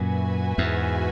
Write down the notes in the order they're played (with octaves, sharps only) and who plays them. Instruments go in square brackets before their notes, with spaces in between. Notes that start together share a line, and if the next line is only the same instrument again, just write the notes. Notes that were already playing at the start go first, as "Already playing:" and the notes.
Already playing: [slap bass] F#2 A#2 [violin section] F#4 B4 E5 G#5
[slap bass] E2 G#2